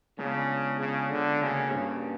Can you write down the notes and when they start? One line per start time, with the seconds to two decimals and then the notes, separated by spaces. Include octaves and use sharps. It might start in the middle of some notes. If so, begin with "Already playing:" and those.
0.18 C#3 G#3 B3 D4 F4 G#4
0.80 C#3
1.10 D3
1.42 C#3 A#3 C#4 F#4
1.72 G2